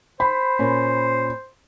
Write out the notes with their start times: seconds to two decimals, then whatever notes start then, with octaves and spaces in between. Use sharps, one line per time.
0.20 C5 B5
0.59 A#2 C#4